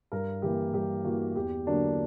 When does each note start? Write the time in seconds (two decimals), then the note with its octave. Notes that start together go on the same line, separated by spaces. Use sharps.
0.12 G2 A#4
0.42 E3 A#3 G4
0.73 G2 G4
1.04 E3 A#3 F#4
1.36 E2 G4
1.66 D3 F#3 A#3 D4